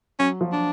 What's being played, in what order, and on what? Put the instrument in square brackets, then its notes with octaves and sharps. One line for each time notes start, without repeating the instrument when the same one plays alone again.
[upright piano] F#3 [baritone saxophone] C#4
[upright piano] F3
[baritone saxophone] D4